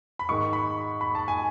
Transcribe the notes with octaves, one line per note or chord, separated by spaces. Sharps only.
B5
G#2 D#3 G#3 C#6
B5
B5
A5
G#5